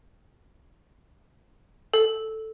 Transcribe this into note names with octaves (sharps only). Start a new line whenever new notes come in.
A4